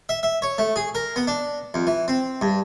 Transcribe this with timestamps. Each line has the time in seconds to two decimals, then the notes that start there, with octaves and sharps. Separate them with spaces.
0.09 E5
0.23 E5
0.42 C#5
0.58 A3
0.76 G#4
0.95 A#4
1.16 B3
1.27 D4
1.74 F2
1.87 E3
2.08 C4
2.41 G2